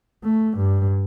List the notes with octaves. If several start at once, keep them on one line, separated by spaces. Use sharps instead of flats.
A3
G2